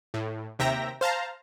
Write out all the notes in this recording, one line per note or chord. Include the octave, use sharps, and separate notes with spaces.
A2
D#2 C3 E5 G5 A#5 A#6
C5 F5 A5 A#5